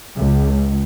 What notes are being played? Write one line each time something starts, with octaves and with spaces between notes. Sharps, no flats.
C#2